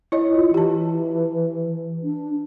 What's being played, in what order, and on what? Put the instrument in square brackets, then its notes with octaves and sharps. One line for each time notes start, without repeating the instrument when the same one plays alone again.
[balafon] E4 C#5 D#5
[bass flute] F4
[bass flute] E3 [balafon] G4 A5
[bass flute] D4